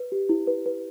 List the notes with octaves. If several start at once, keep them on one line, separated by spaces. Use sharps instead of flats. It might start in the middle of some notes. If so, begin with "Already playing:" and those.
Already playing: B4
G4
E4
B4
B4